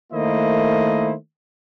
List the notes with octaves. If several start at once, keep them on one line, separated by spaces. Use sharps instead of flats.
D#3 A3 A#3 E4 C5 D#5